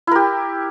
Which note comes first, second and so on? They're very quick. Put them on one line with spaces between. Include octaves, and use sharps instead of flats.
E4 A#4 G4